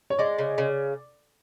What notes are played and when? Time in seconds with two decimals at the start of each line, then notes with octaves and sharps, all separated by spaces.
0.10 C#5
0.18 G#3 D5
0.38 C#3
0.58 C#3